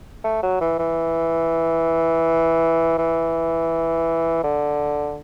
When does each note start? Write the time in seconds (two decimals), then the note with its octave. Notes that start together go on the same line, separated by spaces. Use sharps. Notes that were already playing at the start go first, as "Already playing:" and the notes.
0.24 A3
0.43 F#3
0.60 E3
0.78 E3
2.98 E3
4.43 D3